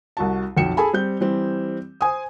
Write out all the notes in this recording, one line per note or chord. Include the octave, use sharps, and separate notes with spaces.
C2 F#4 A5
B1 F2 G5 C#7 E7
G#4 A4 G#5 A5 B5
G3 C4 G6
E3 G3 C4
C5 G#5 D#6